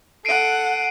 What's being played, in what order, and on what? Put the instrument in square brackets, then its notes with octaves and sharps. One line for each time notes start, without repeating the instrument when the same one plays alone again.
[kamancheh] A4 F#5 [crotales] C7 D7 D#7